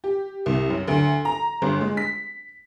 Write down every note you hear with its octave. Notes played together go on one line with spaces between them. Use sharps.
G4
C2
F#2
D2
A#5
G1
G#3
B6